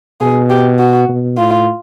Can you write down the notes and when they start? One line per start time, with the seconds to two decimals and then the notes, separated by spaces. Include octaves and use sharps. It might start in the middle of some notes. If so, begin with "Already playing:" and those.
0.21 B2 G#4
0.50 G4
0.79 F#4
1.09 B2
1.38 A2 F4